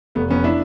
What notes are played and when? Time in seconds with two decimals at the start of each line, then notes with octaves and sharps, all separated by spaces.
0.15 F1 A3 B3
0.30 F2 B3 C#4
0.44 D4 E4